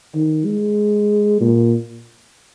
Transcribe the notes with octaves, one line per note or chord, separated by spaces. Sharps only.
D#3
G#3
A#2